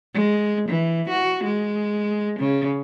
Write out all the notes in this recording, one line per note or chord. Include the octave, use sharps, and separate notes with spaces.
G#3
E3
F#4
G#3
C#3